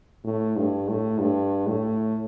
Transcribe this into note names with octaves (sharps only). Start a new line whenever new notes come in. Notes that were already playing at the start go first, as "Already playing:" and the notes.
A2
G2
A2
G2
A2